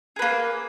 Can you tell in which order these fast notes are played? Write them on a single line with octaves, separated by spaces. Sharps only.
G#4 B4 A#3